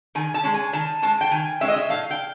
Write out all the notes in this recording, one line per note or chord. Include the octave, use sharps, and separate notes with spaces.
D#3 G#5
A5
G#3 C#4
G#5
D#3 A5
G#3 C#4 A5
G5
D#3 G#5
G#3 C#4 E5
D#5
E5
A2 F5
G5